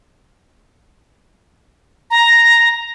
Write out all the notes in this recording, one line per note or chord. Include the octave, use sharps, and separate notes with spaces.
A#5